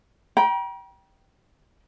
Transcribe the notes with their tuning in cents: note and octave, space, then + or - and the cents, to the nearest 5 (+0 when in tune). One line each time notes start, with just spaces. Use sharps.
G5 -10 A#5 +45